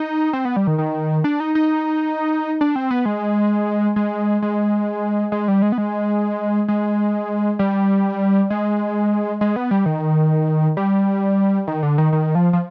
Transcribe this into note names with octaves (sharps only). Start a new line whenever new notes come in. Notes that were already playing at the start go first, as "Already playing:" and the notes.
Already playing: D#4
C4
B3
G3
D#3
D#3
D4
D#4
D#4
D4
C4
B3
G#3
G#3
G#3
G#3
G3
G#3
B3
G#3
G#3
G3
G#3
G#3
B3
G3
D#3
G3
D#3
D3
D#3
D#3
F3
F3